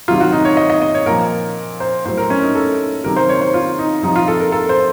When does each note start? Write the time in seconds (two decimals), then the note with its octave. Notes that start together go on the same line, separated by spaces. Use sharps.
0.08 C3 D#3 F#3 F4
0.20 F#4
0.32 D#4
0.45 C#5
0.57 D#5
0.70 D#5
0.82 D#5
0.94 C#5
1.06 A#2 F3 A#4
1.80 C5
2.05 A2 F#3 C5
2.17 A#4
2.30 C#4
2.43 D#4
2.55 A4
3.04 C3 D#3 F#3 A#4
3.16 C5
3.29 C#5
3.41 C5
3.54 F4
3.79 D#4
4.03 C3 F3 D#4
4.16 F4
4.28 A4
4.40 A#4
4.52 A4
4.69 C5